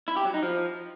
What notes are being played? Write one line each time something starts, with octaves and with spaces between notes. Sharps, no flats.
E4
G4
F#3
D#4
F3